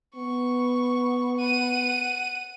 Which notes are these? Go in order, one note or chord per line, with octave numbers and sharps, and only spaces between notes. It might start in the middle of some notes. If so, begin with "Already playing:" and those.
B3 C#6
F#5 D#7